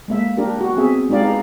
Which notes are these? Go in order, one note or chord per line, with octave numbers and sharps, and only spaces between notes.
G#3 A#3 E5
D4 G4 A#4
F#4 G4
B3 C4 G#4 E5
G#3 D#4 G4 D5 F5
E4 G#4 B4 A#5